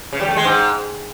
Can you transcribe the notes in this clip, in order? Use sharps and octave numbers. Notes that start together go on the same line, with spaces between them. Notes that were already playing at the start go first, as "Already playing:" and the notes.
C#3
G3
A3
G#3
G#2